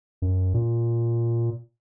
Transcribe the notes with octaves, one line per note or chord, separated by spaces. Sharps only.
F#2
A#2